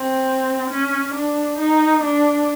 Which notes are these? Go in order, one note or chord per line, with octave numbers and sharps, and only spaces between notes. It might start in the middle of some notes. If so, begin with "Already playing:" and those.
Already playing: C4
C#4
D4
D#4
D4